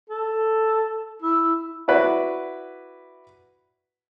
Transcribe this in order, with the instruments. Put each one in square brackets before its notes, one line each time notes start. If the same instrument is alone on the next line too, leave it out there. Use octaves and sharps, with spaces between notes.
[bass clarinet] A4
E4
[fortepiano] E4 F#4 B4 D5